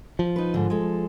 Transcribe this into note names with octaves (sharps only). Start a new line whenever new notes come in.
F3
D#4 B4
G#2 D3
G#3 A4